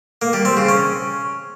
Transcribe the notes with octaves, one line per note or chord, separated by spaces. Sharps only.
A#3
G3
C4
C#3
C#4